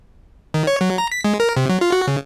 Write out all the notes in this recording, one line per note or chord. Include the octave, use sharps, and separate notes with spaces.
D#3
C#5
F#3
A#5
B6
G#3
A#4
C3
F#3
F4
F#4
C#3